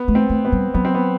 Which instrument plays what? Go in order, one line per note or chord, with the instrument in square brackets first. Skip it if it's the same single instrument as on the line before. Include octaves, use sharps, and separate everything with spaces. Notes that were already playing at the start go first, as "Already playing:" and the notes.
Already playing: [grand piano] B3
[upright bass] A3
[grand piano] C4
[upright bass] A3
[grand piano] B3
[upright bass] G3
[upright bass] F#3 [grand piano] B3
[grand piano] C4
B3